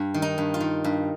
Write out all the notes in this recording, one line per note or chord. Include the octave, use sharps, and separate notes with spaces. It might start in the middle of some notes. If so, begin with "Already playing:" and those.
Already playing: G2
D#3
D#4
G2
F4
D#3
G2